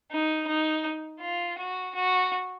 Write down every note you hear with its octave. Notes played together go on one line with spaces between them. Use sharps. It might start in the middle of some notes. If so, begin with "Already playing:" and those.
D#4
D#4
F4
F#4
F#4